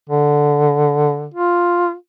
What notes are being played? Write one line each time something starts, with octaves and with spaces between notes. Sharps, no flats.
D3
F4